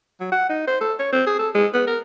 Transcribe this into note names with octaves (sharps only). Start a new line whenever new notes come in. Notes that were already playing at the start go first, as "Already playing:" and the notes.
F#3
F#5
D#4
C5
A4
C#5
C4
G#4
A4
G#3
B3
A#4